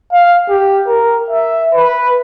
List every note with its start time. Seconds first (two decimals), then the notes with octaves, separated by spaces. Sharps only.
0.13 F5
0.50 G4
0.87 A#4
1.30 E5
1.75 B4